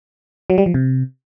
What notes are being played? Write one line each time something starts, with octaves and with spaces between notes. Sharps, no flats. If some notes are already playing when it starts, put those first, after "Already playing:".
F#3
G3
F3
C3